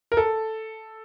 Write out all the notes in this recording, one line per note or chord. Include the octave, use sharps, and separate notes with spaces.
A#4
A4